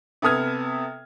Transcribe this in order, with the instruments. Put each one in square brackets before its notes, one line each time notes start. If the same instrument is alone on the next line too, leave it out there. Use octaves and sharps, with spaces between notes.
[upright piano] C3 B3 A4 D#6 F6 G#6